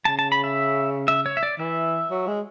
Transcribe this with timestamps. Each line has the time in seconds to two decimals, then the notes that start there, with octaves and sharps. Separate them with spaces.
0.05 C#3 A5
0.19 A5
0.32 B5
0.44 E5
1.08 E5
1.26 C#5
1.37 E5
1.43 D5
1.59 E3 E5
2.11 F#3
2.28 G#3